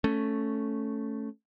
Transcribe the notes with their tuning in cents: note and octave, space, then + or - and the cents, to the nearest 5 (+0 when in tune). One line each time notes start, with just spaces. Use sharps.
A3 +0 C#4 +0